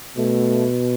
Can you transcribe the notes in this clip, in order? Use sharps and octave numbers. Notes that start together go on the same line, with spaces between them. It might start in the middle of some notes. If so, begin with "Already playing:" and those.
B2 A3